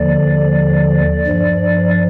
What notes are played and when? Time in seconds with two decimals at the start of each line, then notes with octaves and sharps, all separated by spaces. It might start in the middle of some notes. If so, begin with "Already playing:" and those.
Already playing: D#2 D3 F3 D5
1.27 G2 F3